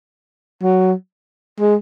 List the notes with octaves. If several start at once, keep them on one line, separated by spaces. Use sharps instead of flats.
F#3
G#3